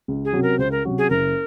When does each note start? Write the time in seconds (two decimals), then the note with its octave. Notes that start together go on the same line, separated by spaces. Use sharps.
0.08 C#2
0.25 G#4
0.33 C3 F#3 C#4 F#4
0.43 A#4
0.58 C#2 C5
0.71 A#4
0.85 C3 F#3 C#4 F#4
0.98 G#4
1.10 F#1 A#4